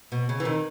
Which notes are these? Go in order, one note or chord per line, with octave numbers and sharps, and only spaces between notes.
B2
C#3
E3
D#3